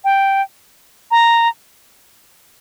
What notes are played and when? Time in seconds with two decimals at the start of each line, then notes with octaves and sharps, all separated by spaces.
0.04 G5
1.11 A#5